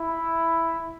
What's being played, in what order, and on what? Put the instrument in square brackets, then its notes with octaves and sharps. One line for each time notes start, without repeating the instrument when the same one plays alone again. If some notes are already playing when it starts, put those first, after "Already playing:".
Already playing: [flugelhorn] E4